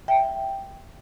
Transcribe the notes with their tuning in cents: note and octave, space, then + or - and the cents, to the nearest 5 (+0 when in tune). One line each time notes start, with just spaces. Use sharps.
E5 +0 G5 +0